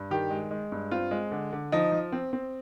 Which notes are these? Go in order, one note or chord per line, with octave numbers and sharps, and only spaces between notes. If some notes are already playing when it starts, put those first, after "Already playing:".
Already playing: G2
D#3 G4
G#3
G#3
G2
C4 F4
G#3
D3
D3
F3 D#4
F3
C4
C4